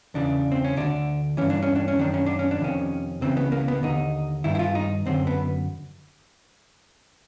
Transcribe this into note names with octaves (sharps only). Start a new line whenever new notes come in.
E2 C#3 E3 D4
C4
C#4
D2 D3 D4
G2 E3 C#4
D4
C#4
D4
C#4
F#2 D#3 D4
C#4
D4
C#4
D4
F2 C3 D#3 C#4
C#2 C#3 E3 C4
B3
A#3
B3
D#2 D3 D#4
G2 D#3 E4
E4
F4
D#4
F#2 D3 C4
B3